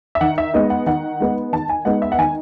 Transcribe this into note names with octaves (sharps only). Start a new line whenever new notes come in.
E5
D#3 F#5
E5
G#3 B3 D#4 D#5
F#5
D#3 F#5
G#3 B3 D#4
D#3 A5
G#5
G#3 B3 D#4 F#5
E5
F#5
D#3 G#5